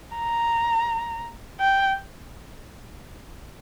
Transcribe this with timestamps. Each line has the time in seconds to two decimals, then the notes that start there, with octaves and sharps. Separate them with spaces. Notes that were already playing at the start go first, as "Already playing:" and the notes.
0.17 A#5
1.60 G5